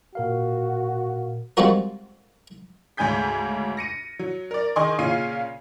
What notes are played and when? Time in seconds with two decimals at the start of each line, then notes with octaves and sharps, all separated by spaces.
0.15 A#2 F#4 A#4 F5
1.57 G3 G#3 C4 F4 F#4 A#4
2.97 D2 G#2 C#3 G#5 G6 B6
3.77 A#6 C#7 D#7
4.19 F#3
4.51 A#4 D5
4.76 D#3 G#4 D#5 G#5 C6 C#6
4.99 A#2 C#3 F5 C7 D#7